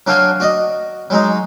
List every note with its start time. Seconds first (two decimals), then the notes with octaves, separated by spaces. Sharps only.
0.07 F#3 D4 F#4 F5 G5 G#5
0.40 F#4 D5 D#5
1.10 F#3 G#3 D#4